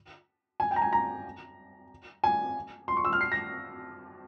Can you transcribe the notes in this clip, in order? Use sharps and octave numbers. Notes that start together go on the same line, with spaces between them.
G#5
G5
A#5
G#5
A#5
G#5
C6
C#6
E6
F6
C7
A#6